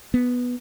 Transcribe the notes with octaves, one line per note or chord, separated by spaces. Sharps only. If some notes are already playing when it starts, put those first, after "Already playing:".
B3